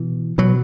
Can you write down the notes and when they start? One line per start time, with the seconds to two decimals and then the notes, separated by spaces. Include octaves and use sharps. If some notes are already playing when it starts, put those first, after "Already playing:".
Already playing: B2 E3
0.38 B2 F#3